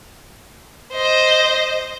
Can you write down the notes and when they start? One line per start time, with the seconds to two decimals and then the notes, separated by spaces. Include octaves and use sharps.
0.93 C5 D#5